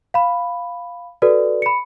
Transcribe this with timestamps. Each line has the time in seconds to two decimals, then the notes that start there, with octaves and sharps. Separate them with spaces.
0.14 F5 B5
1.22 F#4 A4 B4 D5
1.62 B5 C#7